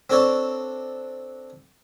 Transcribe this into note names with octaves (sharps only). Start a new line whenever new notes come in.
C4 D4 A4 C#5 D5